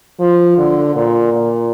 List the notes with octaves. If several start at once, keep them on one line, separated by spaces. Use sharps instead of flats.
F3
D3
A#2
A#2